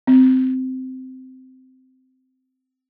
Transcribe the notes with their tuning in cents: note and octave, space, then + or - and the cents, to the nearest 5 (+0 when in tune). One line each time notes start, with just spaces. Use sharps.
C4 -15